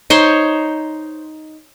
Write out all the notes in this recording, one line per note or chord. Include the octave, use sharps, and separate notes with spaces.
D#4 C5 C#5 C6